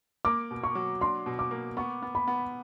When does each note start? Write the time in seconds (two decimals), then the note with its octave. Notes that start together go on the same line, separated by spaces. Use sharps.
0.25 A#3 D6
0.51 B2
0.63 C#6
0.75 F#3
1.01 D4 C6
1.26 B2
1.39 D6
1.51 A#3
1.77 B3 C#6
2.02 B3
2.15 B5
2.27 B3